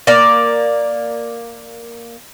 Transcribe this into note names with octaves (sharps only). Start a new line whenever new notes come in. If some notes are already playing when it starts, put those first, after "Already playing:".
A#3 D5